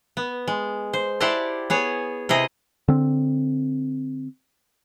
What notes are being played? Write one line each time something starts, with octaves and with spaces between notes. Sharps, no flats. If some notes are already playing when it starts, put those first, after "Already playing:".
B3
G#3
C5
E4 G4 C5 D5 F#5 A5
B3 G#4 C#5
C3 E4 G#4 D#5
D3 C4